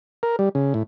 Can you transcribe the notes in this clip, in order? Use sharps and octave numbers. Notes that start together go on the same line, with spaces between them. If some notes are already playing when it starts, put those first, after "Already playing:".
A#4
G3
C#3
A2